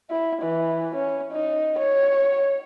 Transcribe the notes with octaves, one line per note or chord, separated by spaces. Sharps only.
E4
E3
C#4
D#4
C#5